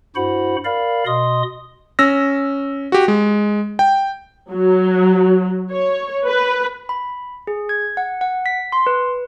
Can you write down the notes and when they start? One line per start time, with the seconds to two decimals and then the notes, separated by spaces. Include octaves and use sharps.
0.16 G2 E4 F#4 C5 F#5 B5
0.65 A#4 D5 F5 B5
1.06 B2 D#5 C6 D#6
1.99 C#4 E6 A#6
2.92 F#4 G4
3.08 G#3
3.79 G5
4.51 F#3
5.71 C#5
6.25 B4
6.89 B5
7.47 G#4
7.69 G#6
7.97 F#5
8.21 F#5
8.46 B6
8.72 C6
8.87 B4